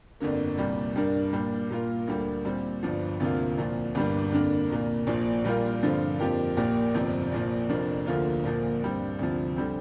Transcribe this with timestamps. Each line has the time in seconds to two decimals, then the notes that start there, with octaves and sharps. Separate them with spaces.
0.20 G1 F2 D3 A#3
0.57 C2 A#2 G3
0.95 G2 G3 A#3 D4 A#4
1.33 A#2 G3 D4 A#4
1.70 A#2 A#3 F4 A#4
2.07 D2 D3 G3 A#3
2.45 A#2 G3 C4
2.83 G1 G2 F3
3.20 D2 C3 F3 A#3 F4
3.58 C2 A#2 F3
3.95 G1 G2 G3 A#3 D4
4.32 F2 D3 A#3 D4 A#4
4.70 C2 A#2 A#3
5.07 A#1 A#2 F3
5.45 A#2 G3 A#3 F4 A#4
5.82 G2 D3 F3 C4 F4
6.19 F2 F3 A#3 G4 A#4
6.57 A#1 A#2 A#3 G4 A#4
6.94 G1 F2 C3 F3 C4
7.32 A#1 A#2 F3
7.69 F1 F2 F3 A#3 D4
8.07 D2 D3 F3 A#3 F4
8.44 A#1 A#2 F3 A#3
8.81 G2 G3 C4
9.19 D2 C3 F3
9.56 D3 G3 C4